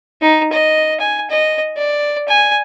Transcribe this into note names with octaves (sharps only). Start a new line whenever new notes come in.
D#4
D#5
G#5
D#5
D5
G#5